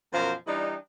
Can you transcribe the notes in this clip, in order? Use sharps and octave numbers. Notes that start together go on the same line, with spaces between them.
F#2 B2 F3 A#4 C5
E3 G3 D4 D#4